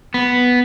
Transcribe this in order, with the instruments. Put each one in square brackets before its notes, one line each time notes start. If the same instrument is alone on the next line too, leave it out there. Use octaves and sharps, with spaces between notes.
[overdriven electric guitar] B3